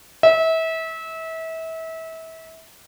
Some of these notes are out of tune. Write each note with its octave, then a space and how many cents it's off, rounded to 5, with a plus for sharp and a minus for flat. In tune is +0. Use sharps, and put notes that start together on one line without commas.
E5 -30